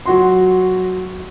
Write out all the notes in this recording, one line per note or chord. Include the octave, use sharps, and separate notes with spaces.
F#3 F#4 C6